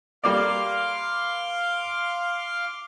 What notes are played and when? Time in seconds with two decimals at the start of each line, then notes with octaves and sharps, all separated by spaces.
0.24 G3 A#3 D5 F5 C6 D6